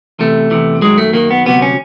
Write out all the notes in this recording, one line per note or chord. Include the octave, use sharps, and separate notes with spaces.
E2 C3 E3 A3
E2 C3 E3
F#2 D#3 F#3 G#3
A3
F#2 D#3 F#3 A#3
B3
D2 C3 D#3 F#3 B3
C#4